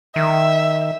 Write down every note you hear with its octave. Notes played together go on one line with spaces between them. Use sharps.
D#3 E5